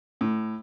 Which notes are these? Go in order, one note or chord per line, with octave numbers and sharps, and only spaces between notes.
A2